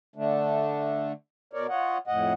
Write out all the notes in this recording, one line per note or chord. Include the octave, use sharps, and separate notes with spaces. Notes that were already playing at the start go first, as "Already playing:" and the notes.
D3 A3 D4
B2 A#4 C#5 D5
F4 C#5 D#5 F#5
F2 A2 D#5 F#5